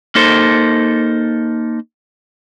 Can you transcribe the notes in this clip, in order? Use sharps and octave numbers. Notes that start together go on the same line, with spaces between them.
A#3 D#4 A4 C5